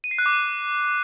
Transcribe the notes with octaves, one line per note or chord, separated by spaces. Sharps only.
D#7
C7
F#6
D6
D#7